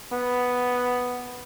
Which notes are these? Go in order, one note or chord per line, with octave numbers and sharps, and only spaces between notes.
B3